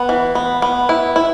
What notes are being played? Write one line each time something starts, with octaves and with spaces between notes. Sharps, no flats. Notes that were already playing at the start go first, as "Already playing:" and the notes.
Already playing: B3
E3
B3
B3
E4
E4